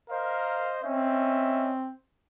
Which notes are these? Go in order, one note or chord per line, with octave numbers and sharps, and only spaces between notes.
A#4 C5 D#5 F5
C4 C#4 D#5 E5